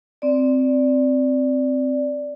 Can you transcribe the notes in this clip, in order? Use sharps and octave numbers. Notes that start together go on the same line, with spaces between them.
C4 D5